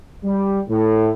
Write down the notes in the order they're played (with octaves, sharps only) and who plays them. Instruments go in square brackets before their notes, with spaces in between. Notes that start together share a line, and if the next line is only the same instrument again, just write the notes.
[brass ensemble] G3
A2